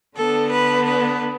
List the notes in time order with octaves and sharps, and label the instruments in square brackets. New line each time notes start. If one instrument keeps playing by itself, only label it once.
[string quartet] D3 B3 D4 A4
B4
B4